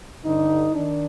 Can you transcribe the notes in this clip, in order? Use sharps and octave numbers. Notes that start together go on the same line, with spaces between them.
G2 D3 D#4
D#3 D4